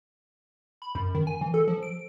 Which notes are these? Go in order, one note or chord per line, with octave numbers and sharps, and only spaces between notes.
B5
F#2
D#3
G#5
E3
A4
F3
D7